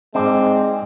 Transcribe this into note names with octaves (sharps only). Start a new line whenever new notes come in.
G#2 G#3 C4 D4